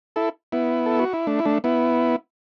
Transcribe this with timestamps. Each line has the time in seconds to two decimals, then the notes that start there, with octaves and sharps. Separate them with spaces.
0.16 E4 A4
0.52 B3 E4
0.86 A4
0.99 F#4
1.13 E4
1.27 A3 D4
1.39 E4
1.45 A3 D4
1.64 B3 E4